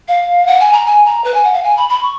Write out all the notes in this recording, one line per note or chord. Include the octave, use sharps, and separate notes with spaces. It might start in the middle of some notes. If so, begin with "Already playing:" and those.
F5
F#5
G#5
A#5
G#5
A#5
B4
G#5
F#5
F5
G#5
B5
B5
C#6